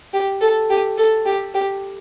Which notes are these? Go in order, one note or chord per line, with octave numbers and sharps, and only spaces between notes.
G4
A4
G4
A4
G4
G4